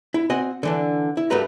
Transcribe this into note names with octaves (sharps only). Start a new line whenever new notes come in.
E4
C4 F#4 D#5 F#5 G#5
D3 E3 D4
E4
G2 A3 A#3 F#4 B4 A#5